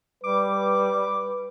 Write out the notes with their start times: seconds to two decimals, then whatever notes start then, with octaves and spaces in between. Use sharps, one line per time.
0.24 G3 B4 D6